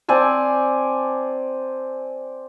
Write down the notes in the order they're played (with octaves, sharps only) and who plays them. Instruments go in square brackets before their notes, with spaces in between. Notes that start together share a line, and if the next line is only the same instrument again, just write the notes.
[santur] C4 D5 G#5 A5